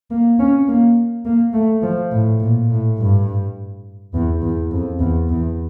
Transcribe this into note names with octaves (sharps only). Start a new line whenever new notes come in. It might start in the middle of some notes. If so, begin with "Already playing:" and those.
A#3
C#4
A#3
A#3
A3
F3
A2
A#2
A2
G2
E2
E2
F2
E2
E2